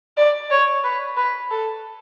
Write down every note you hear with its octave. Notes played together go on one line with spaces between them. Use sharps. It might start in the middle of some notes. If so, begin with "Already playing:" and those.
D5
C#5
B4
B4
A4